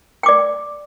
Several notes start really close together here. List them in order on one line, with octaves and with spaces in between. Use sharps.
G5 D6 D5